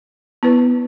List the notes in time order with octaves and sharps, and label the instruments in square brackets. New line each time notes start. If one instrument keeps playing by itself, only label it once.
[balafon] B3 E4 B4